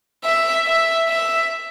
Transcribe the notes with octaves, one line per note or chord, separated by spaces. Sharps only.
E5
E5
E5